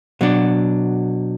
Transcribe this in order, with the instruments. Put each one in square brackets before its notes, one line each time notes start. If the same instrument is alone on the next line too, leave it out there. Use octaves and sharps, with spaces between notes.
[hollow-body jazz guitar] B2 F#3 D4